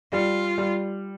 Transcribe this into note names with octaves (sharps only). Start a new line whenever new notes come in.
G3 F4
G3